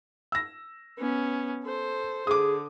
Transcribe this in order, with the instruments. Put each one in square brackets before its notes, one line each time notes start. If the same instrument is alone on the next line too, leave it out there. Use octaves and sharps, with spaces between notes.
[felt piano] E6 A#6
[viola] B3 C#4
A4 C5
[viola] D3 [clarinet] G#4 [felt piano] D6 D#6